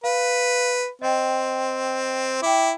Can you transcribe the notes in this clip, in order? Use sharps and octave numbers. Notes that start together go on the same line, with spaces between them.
B4 F5
C4 D#5 G5
E4 G5 D6